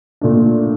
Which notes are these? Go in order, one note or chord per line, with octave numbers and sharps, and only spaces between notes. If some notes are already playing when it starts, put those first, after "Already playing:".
A#2 A3 D4